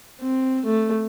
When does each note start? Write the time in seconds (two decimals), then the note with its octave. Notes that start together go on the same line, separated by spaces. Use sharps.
0.21 C4
0.66 A3